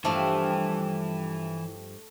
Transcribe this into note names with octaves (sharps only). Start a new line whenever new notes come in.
G2 E3 F3 A3 D4